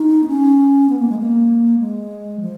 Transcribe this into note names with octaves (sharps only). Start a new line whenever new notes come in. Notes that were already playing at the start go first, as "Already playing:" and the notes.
Already playing: D#4
B3
C#4
B3
A#3
G#3
A#3
G#3
F3